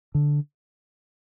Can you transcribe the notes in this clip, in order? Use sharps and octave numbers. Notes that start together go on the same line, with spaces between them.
D3